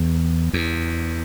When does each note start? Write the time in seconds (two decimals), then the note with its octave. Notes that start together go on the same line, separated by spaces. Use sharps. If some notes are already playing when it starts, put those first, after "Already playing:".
Already playing: E2
0.53 E2